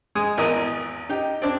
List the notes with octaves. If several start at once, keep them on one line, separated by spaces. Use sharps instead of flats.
G#3 G#5 D#6
G#1 E2 E3 A#4 D#5
D#4 G4
C4 D4